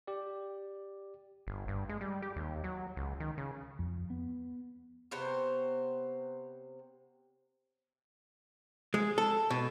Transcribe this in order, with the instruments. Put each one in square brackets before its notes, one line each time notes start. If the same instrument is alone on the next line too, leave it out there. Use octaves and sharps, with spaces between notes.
[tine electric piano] G4 D5
[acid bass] G1
G2
G#3
G3
G4
D#2
F#3
C#2
D#3
C#3
[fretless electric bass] F2
B3
[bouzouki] C3 B3 C5 C#5
[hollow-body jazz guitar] G#3
A4
B2